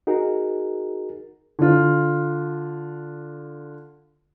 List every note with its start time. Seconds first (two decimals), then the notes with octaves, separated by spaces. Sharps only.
0.07 D#4 F#4 G#4 A#4
1.59 D3 F4